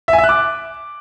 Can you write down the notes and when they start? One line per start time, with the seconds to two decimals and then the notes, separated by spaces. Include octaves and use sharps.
0.08 E5
0.13 G#5
0.18 E5
0.24 F#6
0.29 D6